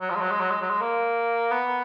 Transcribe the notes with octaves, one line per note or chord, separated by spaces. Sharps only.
F#3
F3
G#3
F#3
G#3
F#3
G#3
F#3
G#3
A#3
B3